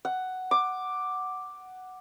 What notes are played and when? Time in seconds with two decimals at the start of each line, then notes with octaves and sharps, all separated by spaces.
0.05 F#5
0.51 D6